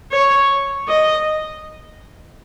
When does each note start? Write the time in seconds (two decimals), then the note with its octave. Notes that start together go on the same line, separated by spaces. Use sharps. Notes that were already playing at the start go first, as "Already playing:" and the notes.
0.12 C#5
0.88 D#5